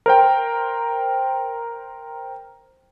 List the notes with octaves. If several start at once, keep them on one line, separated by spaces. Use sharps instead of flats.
A#4 C5 G5